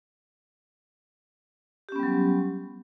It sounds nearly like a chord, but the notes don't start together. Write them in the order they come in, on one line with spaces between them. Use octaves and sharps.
G4 C#4 B3 G3 F#3